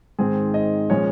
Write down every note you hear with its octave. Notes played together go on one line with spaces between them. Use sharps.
G#2 D#3 G#3 C4 G#4
D#5
A#2 F3 G#3 C#4 C#5